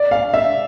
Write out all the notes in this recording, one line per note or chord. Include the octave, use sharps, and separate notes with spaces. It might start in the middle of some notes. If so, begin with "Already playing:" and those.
Already playing: D5
F5
E5